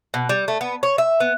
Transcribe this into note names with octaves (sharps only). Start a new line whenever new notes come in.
B2
G3
A3
B3
C#5
E5
B3